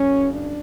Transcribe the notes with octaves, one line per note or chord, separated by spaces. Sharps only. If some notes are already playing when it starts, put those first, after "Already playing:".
Already playing: F#1 F#2 C#3 C#4
D4